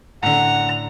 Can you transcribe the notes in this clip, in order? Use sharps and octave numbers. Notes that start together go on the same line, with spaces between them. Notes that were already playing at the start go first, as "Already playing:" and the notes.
A2 D3 F#5 A#5